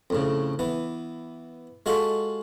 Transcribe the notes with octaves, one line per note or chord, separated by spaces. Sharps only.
F2 A2 C#3
E3 B3
G#3 F4 F#4 G#4 A4